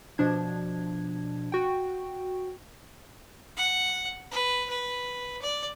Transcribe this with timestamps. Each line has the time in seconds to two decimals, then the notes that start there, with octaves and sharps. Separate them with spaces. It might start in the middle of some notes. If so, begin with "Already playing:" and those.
0.18 B2 F3 D4 G#6
1.52 F#4 G5
3.57 F#5
4.31 B4
4.70 B4
5.42 D5